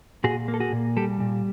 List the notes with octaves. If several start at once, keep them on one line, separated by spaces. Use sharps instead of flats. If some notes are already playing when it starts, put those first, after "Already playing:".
A#2 F#4 G#4
A#3
A4
F#4 G#4
A#2
G3 G4 A4
A#2